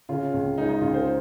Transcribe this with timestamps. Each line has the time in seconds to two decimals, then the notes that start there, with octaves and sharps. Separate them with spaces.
0.09 C#3 F4
0.34 C#2
0.58 G#3 D#4
0.69 D#4
0.81 C#2 F4
0.94 C5